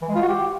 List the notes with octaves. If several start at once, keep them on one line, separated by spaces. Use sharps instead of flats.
E3
G#3
F4
F#4
G4